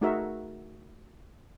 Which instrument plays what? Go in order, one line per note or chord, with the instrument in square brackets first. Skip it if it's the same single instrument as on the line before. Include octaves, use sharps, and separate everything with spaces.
[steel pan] A3 D#4 F#4 G#4 A#4 E5